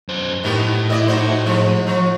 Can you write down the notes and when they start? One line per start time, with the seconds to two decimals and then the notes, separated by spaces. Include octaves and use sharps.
0.09 F#2 C5
0.44 A2 D#3 B3 G4
0.90 E4 D5 D#5
1.08 D#4 F#4 C5
1.46 F3 G#3
1.87 F3